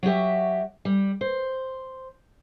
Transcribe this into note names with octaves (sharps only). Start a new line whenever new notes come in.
F#3 F#4 G4 E5
G3
C5